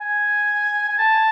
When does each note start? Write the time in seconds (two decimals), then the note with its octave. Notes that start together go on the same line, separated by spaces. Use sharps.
0.01 G#5
0.89 G#5
0.98 A5